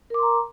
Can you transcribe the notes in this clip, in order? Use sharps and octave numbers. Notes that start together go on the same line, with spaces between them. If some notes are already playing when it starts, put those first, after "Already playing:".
A#4 A#5 C6 D6